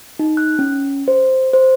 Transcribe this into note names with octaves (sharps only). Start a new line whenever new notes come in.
D#4
F#6
C#4
C5
C5